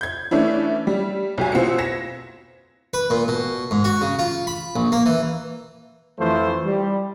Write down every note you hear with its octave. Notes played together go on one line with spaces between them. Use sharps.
G6 G#6
E3 A3 C#4 D4 E4
G3
B1 G4 G#5
B2 C4 E4 F4 C#7
G#6 A#6 B6 E7
B4
A#2
B2
G#2
F#4
C#3
F4
B5
A#1
A#3
E3
F2 E3 F3 A3 C5
G3